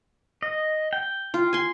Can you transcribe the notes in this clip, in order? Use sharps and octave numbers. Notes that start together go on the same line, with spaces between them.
D#5
G5
F4
G#5 C6